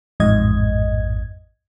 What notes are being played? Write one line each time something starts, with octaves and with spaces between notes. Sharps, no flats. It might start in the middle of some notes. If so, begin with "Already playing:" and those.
A1 F2 G#2 D#5 G#6